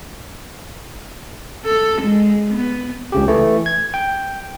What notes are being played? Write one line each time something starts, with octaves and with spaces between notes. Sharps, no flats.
A4
G#3
B3
C#2 C#3 G4
E3 A3
G#6
G5